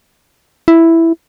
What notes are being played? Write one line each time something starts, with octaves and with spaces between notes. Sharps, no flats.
E4